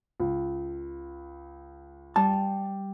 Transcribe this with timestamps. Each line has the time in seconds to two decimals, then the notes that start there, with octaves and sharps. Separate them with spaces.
0.20 C#2
2.16 G3 A5